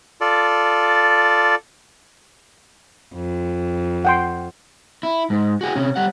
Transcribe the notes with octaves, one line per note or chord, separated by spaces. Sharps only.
F4 A4 D5
F2
F#5 G5 C6
E4
G#2
F#4 G#4
C3 C#4
G3 F#5